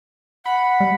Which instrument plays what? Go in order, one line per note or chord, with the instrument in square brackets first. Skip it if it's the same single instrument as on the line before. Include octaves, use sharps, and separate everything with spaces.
[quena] F#5 [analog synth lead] B5
[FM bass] G3